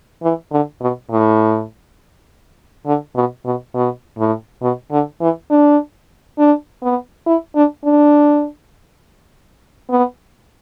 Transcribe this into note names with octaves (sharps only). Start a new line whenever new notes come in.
E3
D3
B2
A2
D3
B2
B2
B2
A2
B2
D3
E3
D4
D4
B3
E4
D4
D4
B3